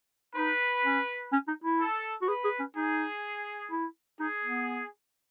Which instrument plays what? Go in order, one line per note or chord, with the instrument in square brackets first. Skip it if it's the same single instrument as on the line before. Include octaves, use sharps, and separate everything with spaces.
[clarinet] D#4 [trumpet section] B4
[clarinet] C#4
C#4
D#4
E4
[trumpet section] A4
[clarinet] F#4
[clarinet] G#4 [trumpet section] B4
[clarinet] G#4
C#4
[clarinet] D#4 [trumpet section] G#4
[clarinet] E4
[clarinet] D#4 [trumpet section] G#4
[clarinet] B3